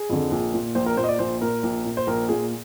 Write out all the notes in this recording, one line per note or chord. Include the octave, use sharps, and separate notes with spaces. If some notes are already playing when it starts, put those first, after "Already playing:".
Already playing: G#4
F2 D3
A#1
A#2
A#1 C5
A#4
A#2 C5
D#5
D5
A#1 C5
A#2 A#4
A#1
A#2
C5
A#1 A#4
A#2 G#4